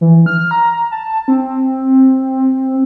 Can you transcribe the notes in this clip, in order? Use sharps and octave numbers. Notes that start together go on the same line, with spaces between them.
E3
F6
A#5
A5
C4